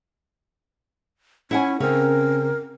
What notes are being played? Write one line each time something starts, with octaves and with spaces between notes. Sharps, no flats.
C#4 E4 F#5 G#5
C#3 C4 C#4 A#4